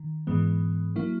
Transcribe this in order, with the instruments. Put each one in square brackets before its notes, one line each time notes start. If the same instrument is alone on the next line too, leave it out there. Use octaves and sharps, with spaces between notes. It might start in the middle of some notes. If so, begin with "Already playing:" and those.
Already playing: [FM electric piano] D#3
G#2 E3 G#3 B3
F#3 A#3 E4